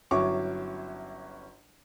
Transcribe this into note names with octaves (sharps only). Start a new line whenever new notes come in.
G1 F#3 C#4 E4 C#6 D6